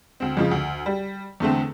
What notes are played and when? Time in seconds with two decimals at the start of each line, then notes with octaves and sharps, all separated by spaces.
0.20 D2 C4
0.37 F2 C#3 F3
0.51 D2
0.86 G3
1.40 E2 D3 A3 C4